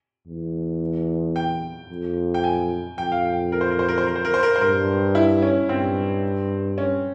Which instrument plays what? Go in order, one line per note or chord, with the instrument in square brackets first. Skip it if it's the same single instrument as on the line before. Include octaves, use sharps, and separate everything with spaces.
[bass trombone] E2
[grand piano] G5
[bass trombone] F2
[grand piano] G5
G#5
[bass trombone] F2 [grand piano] G5
[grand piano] F5
G5
A#4
C5
A#4
C5
A#4
C5
A#4
C5
A#4
C5
A#4
C5
[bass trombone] G2 [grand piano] A#4
[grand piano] E4
C#4
[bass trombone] G2 [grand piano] C4
[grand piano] C#4